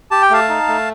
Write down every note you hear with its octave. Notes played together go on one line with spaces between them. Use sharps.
G4 A5
G5
A3 F5 A5
D#4
A3